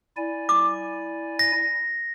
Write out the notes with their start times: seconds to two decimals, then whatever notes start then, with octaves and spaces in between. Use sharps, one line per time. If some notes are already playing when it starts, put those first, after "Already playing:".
0.17 E4 D5 G#5
0.49 D6
1.39 A#6